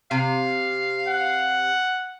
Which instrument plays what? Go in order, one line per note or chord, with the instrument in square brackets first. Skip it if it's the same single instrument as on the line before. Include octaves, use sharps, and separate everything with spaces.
[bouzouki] C3 [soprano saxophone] F5
[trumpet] F#5